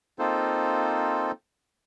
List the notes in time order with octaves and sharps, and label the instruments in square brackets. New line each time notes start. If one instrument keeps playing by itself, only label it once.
[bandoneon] A#3 C4 D#4 F4 A4 C5